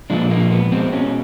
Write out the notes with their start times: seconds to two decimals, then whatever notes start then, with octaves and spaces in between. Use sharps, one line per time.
0.10 A#2 F3 G#3 D4
0.30 A#3
0.51 B3
0.72 B2 G#3 C4
0.93 C#4